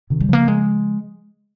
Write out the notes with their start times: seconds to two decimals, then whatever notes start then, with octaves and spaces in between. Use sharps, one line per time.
0.10 C3 D#3
0.21 G3
0.29 C#3 F3 A#3
0.48 G#3